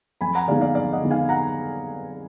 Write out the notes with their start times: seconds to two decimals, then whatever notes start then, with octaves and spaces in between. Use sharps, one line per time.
0.21 F2 G#5 B5
0.35 F#5 A#5
0.48 D3 G#3 B3 D#4 D5 F5
0.61 D5 F5
0.75 F2 D5 F5
0.93 D#5 F#5
1.02 D3 G#3 B3 D#4
1.11 F5 G#5
1.29 F#5 A#5